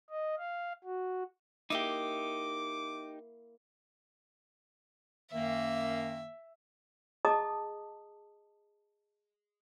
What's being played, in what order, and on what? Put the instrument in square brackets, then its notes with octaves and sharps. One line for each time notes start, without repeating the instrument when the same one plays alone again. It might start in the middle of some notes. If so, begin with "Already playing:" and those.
[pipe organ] D#5
F5
F#4
[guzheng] A#3 E4 [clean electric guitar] D#4 G4 [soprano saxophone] D6
[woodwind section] F#2 D#3 A#3 [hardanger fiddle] E5
[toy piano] G#4 D#5 A5 A#5 D6 D#6